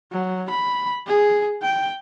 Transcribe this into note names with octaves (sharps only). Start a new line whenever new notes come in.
F#3
B5
G#4
G5